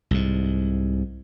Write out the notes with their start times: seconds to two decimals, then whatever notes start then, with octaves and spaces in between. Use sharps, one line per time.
0.11 C2 G#2